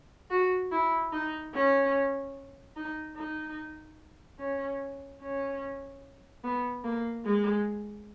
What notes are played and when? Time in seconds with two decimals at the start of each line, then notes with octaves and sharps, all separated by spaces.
0.30 F#4
0.72 E4
1.12 D#4
1.54 C#4
2.76 D#4
3.16 D#4
4.39 C#4
5.22 C#4
6.44 B3
6.84 A#3
7.25 G#3